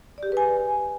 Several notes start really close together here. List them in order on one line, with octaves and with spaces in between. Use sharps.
D5 G4 G#4 B4 G#5